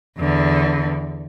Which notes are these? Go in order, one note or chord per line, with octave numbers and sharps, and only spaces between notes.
E2 D3